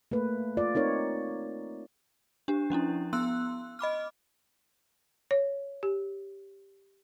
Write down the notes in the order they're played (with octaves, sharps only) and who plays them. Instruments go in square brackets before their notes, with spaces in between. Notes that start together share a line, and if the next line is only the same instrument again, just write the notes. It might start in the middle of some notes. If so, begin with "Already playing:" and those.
[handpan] A3 A#3 B4
F4 D5
C4 D#4 A#4 C#5
[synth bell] D4 G4
F3 C#4 D4 E4
B3 C6 E6 F#6
D#5 B5 D6 F6
[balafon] C#5
G4